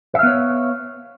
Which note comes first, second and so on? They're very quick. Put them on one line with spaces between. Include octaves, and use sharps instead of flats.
E5 F5 B3 C#5